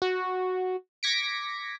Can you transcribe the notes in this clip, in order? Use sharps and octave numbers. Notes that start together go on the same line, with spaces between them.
F#4
D6 G#6 A#6 B6 C#7 D7